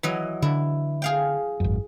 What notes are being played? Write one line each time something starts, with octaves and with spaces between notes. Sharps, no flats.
E3 F#3 D#5
D3 E4
G#4 F5 G5
G#1 F#2